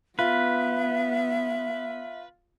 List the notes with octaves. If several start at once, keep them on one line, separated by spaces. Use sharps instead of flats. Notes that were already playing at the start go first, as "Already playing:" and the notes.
B3 F4 B4 E5